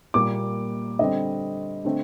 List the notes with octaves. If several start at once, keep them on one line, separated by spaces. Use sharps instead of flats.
A#2 G3 A#3 D6
D3 G3 C4 D#5
D3 A3 C4